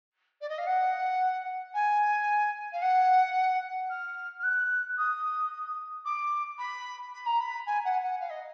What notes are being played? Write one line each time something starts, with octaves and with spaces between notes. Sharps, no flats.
D5
D#5
F5
F#5
G#5
F5
F#5
F6
F6
F#6
D#6
D6
B5
B5
A#5
B5
G#5
F#5
F#5
F5
D#5